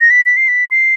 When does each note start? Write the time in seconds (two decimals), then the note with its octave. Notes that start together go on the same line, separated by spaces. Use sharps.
0.01 A#6
0.10 B6
0.26 B6
0.37 C7
0.48 B6
0.71 C7